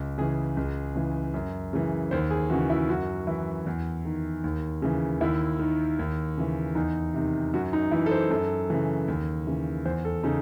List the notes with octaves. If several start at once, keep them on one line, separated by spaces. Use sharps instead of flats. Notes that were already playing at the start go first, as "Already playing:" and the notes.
Already playing: C#2
C#3 E3 G#4
C#2
C#3 E3
F#2
C#3 E3
D#2 C5
G#4
C#3 E3 F#4
E4
F#2 F#4
E3 E4
E2
D#3
D#2
C#3 E3
D#2 E4
D#3
D#2
C#3 E3
E2 D#4
C3 D#3
F#2 F#4
D#4
E3 E4
A4
C5
F#2 A4
C#3 E3
D#2
C#3 E3
E2 C5
A4
C#3 D#4